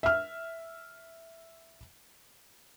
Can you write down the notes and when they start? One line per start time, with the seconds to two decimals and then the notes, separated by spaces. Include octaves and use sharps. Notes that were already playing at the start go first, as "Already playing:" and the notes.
0.03 E5 F6